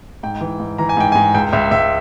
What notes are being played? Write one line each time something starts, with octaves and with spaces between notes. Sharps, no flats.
G#2 G5
E3
G#2
E3 A#5
G#5
G#2 G5
G#2 G#5
C#2 G5
C#2 E5
C#2 E5